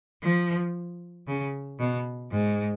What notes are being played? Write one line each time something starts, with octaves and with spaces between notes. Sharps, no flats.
F3
C#3
B2
G#2